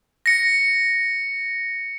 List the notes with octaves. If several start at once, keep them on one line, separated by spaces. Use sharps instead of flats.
A#6 C#7